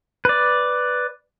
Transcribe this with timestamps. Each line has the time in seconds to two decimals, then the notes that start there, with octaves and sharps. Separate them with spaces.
0.25 B4 D5